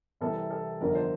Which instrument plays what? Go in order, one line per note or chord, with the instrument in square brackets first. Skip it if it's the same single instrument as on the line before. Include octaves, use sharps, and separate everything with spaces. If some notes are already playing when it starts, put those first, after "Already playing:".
[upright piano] C2 C3 E3 A4
A4
G1 F2 D3 A#4
C5